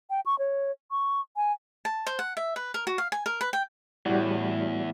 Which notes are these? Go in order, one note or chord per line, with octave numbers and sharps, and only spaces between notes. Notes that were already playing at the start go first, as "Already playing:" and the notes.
G5
C#6
C#5
C#6
G#5
A5
C5
F#5
E5
B4
A#4
F#4
F5
G#5
A#4
B4
G5
E2 A2 G3 E4 F#4 D5